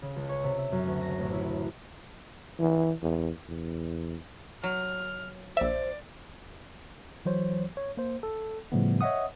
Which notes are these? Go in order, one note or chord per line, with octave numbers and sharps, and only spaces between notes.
C#3
C#2
C#5
C3
E5
F#2
D2
A#6
A1
E4
C3
E3
E2
E2
F#3 F6
A#1 C5 D5 E5
E3 F#3 C5 C#5
C#5
A#3 C5
A4
A2 C#3 F3 G3 A3 B3
C#5 D#5 E5 F#5 D#6